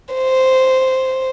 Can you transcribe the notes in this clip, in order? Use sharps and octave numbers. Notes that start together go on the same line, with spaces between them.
C5